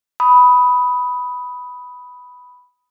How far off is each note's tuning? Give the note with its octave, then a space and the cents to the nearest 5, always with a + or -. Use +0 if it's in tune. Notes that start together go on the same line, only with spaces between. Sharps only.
B5 +0 D#6 +15